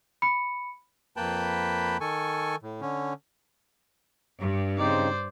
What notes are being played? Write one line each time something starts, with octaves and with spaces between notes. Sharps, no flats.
B5 C#7
F2 A#3 B4 G5 A5 B5
D#3 A4 G#5 C#6
A2
D3 C#4
G2
C#3 C4 D#4 C5 D5